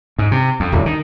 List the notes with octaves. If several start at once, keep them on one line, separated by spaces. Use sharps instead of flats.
G#2
C3
F2
D1
D#3